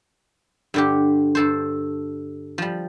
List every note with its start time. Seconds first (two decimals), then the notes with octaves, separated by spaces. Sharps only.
0.74 G2 D3 G4
1.35 G2 A4 C5
2.58 F3 G3